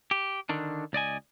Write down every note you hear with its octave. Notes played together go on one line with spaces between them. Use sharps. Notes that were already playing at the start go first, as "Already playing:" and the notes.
G4
D3 D#3 D4
C#2 D5 D#5 G#5